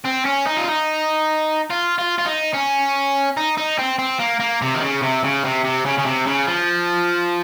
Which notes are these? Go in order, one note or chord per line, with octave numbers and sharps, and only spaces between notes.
C4
C#4
D#4
F4
D#4
F4
F4
F4
D#4
C#4
D#4
D#4
C4
C4
A#3
A#3
C3
D#3
C#3
C3
C#3
C3
C3
C#3
C#3
C3
C#3
F3